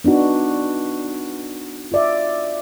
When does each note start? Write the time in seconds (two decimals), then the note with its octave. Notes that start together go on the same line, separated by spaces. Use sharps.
0.04 B3 D4 D#4 F#4
1.92 F4 D5 E5